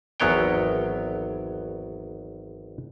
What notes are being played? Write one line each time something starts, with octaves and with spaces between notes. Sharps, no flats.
G#1 E2 F#3 B3 C#5 G5